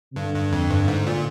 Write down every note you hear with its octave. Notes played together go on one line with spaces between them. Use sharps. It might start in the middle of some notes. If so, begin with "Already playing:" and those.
C3
G2 D3
G2
F2
G2
G#2
A#2